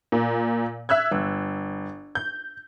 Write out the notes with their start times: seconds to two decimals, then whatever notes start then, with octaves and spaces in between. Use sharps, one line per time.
0.12 A#2
0.89 E5 E6 F#6 G#6
1.11 G1
2.15 G6